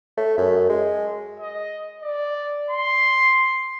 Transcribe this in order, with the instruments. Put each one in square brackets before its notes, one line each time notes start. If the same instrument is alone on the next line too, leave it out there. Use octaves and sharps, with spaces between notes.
[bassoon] A3
F#2
G#3
[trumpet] D#5
D5
C6